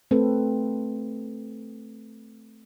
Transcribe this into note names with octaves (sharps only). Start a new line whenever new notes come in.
A3 C4 A4 B4